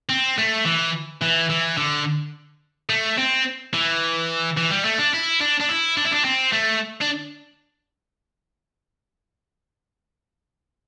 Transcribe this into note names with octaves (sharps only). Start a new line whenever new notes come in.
C4
A3
E3
E3
E3
D3
A3
C4
E3
E3
G3
A3
D4
E4
D4
D4
E4
D4
E4
D4
C4
A3
D4